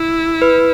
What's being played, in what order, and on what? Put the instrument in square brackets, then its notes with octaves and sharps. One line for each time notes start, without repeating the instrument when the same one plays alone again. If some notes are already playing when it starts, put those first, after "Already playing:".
Already playing: [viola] E4
[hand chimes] B4